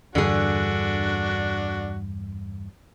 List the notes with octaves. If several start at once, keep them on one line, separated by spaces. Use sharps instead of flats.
E2 G2 D3 D4 F#4 G#4